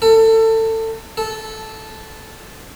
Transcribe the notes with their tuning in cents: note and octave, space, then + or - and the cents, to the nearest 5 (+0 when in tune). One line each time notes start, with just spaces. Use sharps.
A4 +25
A4 -10